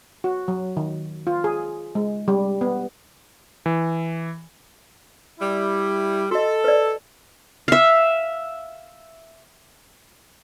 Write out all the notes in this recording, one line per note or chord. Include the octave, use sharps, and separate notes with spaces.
F#4
F#3
D#3
F4
G#4
G#3
G3
B3
E3
G3 E4
F#4 A4 D#5
B4 D5
E5 F5